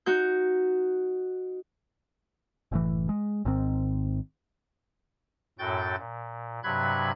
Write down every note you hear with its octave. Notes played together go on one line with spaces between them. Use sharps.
D#4 F#4 G6
F#1 A2 E3
G#3
G#1 G#2 D#3 C4
F#2 A2 F#4 G5 G6 A6
A#2
G2 C3 F#3 B5 F#6 G#6